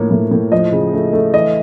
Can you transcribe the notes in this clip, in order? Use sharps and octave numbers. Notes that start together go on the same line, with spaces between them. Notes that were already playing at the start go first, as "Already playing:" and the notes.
Already playing: A2 F3 A#3 C#5
A2
A2
F3 D#5
C#3
A3
A3
E3 D#5